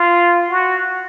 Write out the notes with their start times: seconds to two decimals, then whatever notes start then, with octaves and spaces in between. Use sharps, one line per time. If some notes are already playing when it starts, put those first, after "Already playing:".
Already playing: F4
0.50 F#4